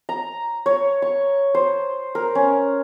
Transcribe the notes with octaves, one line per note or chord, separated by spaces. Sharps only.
A#5
C#5
C#6
C5
A#4
C#4